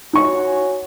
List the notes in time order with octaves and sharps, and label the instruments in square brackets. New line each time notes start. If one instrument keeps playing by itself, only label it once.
[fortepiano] D#4 C#6 [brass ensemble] F#4 C#5 G#5